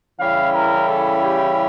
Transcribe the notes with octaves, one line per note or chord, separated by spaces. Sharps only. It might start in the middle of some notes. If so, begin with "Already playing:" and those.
C#3 E3 G3 C#4 E4 F5
A#4
A4
G4